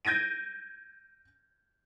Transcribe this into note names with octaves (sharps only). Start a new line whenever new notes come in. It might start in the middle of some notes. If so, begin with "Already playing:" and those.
G6 G#6 A#6 D7 D#7